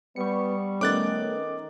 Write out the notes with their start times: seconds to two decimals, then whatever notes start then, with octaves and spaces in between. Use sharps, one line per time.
0.16 G3 B3 C#6 C#7
0.81 D#3 A3 B3 C#4 D6 F#6 A6